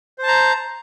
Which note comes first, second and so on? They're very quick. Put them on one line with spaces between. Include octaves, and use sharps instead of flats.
C5 A5 A#5